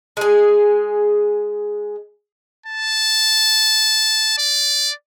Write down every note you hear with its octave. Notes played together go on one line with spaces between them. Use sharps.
G#3 G#4
A5
D5